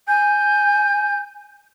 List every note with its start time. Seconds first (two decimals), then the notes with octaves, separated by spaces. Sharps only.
0.08 G#5 G6